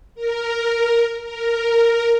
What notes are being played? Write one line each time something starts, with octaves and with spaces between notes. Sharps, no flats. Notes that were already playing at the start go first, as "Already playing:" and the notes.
A#4
A#4